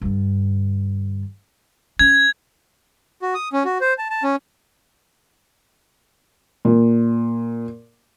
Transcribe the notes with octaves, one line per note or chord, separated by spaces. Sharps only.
G2 D3
C#4 G#6
F#4
D#6
C#4
F#4
C5
A5
A5
C#4
A#2